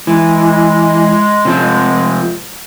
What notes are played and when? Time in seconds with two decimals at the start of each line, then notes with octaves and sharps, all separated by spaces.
0.07 E3 G#3
1.45 C3 F3 C4